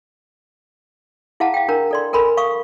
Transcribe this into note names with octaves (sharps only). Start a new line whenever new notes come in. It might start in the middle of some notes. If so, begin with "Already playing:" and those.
E4 G#4 F5 F#5 A5 A#5
F5 G5
D4 A#4 A#5
A4 D5 C6
A4 A#4 G#5 B5 C6
F5 C#6 D#6